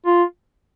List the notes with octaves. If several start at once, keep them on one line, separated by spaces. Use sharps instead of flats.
F4